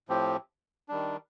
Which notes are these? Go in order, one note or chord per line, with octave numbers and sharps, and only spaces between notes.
A2 F3 C4 G4
D#3 G3 D4